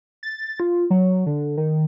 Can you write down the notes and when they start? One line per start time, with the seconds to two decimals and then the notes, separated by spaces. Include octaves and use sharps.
0.23 A6
0.60 F4
0.90 F#3
1.26 D3
1.57 D#3